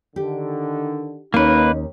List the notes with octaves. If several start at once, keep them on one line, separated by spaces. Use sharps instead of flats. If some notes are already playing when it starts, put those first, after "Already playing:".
D3 D#3 G4
D#2 A#3 C#4 D#4 B4